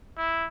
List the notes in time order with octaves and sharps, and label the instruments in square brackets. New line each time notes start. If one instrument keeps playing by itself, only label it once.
[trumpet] E4